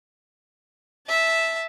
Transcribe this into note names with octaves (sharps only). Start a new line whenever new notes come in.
E5 A5